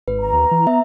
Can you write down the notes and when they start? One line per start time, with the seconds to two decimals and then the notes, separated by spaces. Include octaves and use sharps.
0.08 G#1 B4
0.20 A#5
0.33 D#2
0.51 E3
0.67 B3 E5